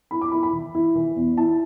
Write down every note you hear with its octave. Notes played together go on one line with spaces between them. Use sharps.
E4 B5
D6
E4 B5
B5
E3
E4
E3
E2
E4 A5